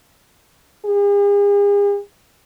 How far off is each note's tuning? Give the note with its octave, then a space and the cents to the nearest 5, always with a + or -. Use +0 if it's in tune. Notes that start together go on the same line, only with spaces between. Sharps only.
G#4 -45